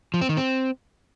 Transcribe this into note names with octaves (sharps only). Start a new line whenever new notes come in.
F3
C4
D#3
C4